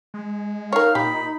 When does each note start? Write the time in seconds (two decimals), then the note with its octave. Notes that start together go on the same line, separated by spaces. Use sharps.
0.14 G#3
0.73 D#4 A#4 C#5 F5
0.95 A#2 G4 B5